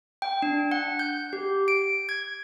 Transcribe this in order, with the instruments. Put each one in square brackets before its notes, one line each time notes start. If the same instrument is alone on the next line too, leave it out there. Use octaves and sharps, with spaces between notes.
[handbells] G5
D4
F#5
G6
G4
D7
G#6